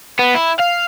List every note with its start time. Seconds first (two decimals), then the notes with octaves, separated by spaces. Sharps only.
0.19 B3
0.35 E4
0.60 F5